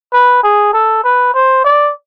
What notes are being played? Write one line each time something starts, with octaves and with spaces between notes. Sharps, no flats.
B4
G#4
A4
B4
C5
D5